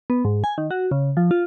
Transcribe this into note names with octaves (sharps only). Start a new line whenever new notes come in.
B3
G#2
G#5
D#3
F#4
C#3
F3
F4